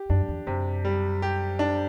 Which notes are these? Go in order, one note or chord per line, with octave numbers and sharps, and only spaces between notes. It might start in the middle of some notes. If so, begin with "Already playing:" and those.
Already playing: G4
F#2 D4
E2
F#2 C3
G3
G4
D4